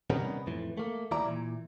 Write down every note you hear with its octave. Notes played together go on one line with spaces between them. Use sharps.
C3 D#3 G3 B3 C#4 D#4
F2 A2 E3
A3 A#3
D#2 G3 E4 D5 E5 A#5
A#2 E3